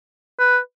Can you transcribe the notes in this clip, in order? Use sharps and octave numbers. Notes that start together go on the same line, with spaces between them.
B4